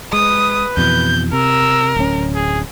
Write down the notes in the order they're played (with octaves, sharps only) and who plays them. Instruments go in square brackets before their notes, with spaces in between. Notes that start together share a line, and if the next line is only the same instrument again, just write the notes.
[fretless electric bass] G#3 [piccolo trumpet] B4 [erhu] D#6
[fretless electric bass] F2 B2 E3 [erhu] G6
[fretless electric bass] C3 [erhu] A#4 [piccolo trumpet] E6
[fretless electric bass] D1 C#4
[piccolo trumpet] G#4